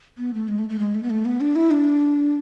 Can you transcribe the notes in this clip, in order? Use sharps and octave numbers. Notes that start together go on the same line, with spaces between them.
B3
A3
G#3
A3
A3
G#3
A3
B3
A3
B3
D4
E4
D4